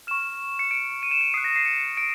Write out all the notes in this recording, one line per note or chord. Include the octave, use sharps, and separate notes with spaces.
C#6 F6 E7
C#7
D7
D#7
E7
D#7
D#6 F#6 C7
A#6
C7
C#7
D7